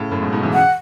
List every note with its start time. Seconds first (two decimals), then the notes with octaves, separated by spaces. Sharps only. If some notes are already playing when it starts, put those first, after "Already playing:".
Already playing: A2 C#3
0.11 F#2 A2
0.22 G#2 B2
0.32 G#2 B2
0.43 C#3 E3
0.54 F#5